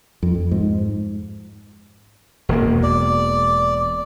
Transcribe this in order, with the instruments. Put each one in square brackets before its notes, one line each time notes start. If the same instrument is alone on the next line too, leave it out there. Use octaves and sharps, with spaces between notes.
[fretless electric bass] F2
G#2
[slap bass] E1 E2 A#3
[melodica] D5